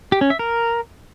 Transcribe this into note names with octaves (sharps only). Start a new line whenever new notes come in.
G4
C#4
E5
A#4